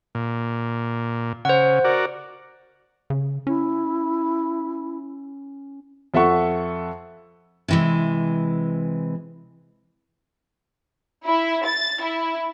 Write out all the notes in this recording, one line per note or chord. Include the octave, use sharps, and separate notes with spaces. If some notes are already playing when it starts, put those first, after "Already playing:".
A#2
C#3 C5 F#5
F#4 A#4 D5
C#3
C#4 E4
F2 A4 E5 F#5 C#6
C3 E3 G#3
E4
A6
E4